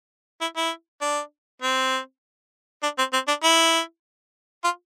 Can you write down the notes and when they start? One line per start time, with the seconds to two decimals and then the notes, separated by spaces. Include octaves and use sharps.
0.41 E4
0.57 E4
1.01 D4
1.62 C4
2.83 D4
2.98 C4
3.13 C4
3.28 D4
3.43 E4
4.64 F4